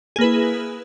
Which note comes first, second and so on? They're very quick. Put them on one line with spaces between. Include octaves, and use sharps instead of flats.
G#4 A#3 B4 E4